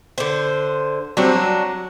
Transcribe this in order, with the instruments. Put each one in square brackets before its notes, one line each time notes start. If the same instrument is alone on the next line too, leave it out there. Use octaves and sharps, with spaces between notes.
[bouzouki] D3 C5
[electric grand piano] F#3 G3 C4 [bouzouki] D4 F#4
[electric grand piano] F#3